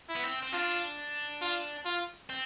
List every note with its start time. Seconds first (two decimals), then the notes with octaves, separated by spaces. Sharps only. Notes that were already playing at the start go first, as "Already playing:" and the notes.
0.09 E4
0.16 B3
0.24 C4
0.43 C4
0.53 D4 F4
1.42 F4
1.85 F4
2.30 C4